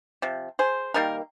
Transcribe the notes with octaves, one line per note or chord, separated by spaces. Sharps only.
C3 F3
G#4 C5
D#3 G3 A#3 A#4